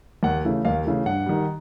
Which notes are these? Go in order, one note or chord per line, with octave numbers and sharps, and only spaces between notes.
D#2 F#5
C#3 E3 A3
D#2 F5
C#3 E3 A3
G2 F#5
D#3 G3